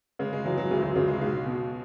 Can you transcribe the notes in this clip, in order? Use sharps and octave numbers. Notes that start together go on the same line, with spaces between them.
C#3 G#3
G#3
E3 F#3
F#3
D2 G#3
F#3
C#3 G#3
G#3
B1 G#3
B2